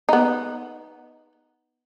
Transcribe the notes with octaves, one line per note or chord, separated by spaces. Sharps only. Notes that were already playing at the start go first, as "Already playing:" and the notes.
B3 D#4